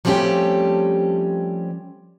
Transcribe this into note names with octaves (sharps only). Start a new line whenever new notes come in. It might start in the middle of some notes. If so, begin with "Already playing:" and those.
F3 G3 A3 C4 C#4 G4